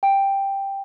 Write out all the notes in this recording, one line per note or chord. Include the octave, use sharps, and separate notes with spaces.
G5